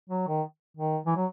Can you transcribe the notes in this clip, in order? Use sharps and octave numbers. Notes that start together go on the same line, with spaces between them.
F#3
D#3
D#3
E3
F#3